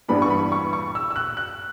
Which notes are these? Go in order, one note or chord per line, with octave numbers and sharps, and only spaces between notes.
G2 E3 G3 B3 D4 B5
C#6
B5
C#6
C#6
E6
E6
F#6
F#6